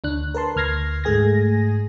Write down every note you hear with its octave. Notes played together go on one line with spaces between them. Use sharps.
D2 D4 F#6
A#4 B4 A5 C6
D2 F6 G#6 A#6 C7
G#2 A3 G#4 G#5 G#6 A#6